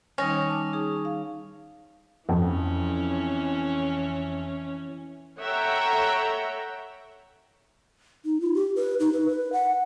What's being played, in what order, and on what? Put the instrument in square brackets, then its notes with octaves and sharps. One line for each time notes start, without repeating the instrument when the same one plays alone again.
[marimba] D#3 G3 D#4 [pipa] C#4
[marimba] A5 D6
D#4 G#4
F5
[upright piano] F2 [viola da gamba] E3 C#4
[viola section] A4 C#5 E5 F#5 G5 A#5
[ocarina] D#4
F4
G4
B4
D#4
B4
B4
F#5